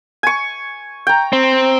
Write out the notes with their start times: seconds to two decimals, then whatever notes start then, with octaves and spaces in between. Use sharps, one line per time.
0.23 G#5 C#6
1.07 G5 A#5
1.33 C4